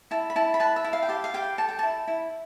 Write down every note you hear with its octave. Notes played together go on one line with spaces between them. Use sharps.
E4 A5
B5
E4 A5
B5
B4 A5
E5
E4
F5
G5
G4 A5
F5
G4 G5
A4 A5
G5
E4 A5
E4